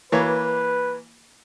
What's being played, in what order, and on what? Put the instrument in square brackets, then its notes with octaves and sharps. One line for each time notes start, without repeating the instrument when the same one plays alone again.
[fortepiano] E3 A#3 C#5 [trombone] B4